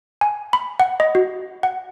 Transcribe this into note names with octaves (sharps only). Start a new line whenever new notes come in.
G#5
B5
F#5
D#5
F#4
F#5